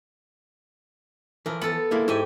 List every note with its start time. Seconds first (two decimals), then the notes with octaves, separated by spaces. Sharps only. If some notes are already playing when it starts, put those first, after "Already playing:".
1.46 E3 F3 A#4
1.61 B3 A4
1.91 G#3 A#3 E4
2.08 G#2 E4 G4 G#5